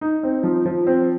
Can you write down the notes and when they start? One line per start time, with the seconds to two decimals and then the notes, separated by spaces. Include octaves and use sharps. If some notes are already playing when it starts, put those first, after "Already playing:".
0.01 D#4
0.23 C4
0.43 F3
0.66 F3
0.87 C4